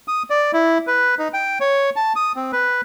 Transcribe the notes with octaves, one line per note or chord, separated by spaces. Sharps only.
D#6
D5
E4
B4
D#4
G5
C#5
A5
D#6
C4
B4